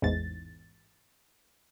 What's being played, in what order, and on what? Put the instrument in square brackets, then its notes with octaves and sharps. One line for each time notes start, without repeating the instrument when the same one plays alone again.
[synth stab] A1 E2 G#2 A6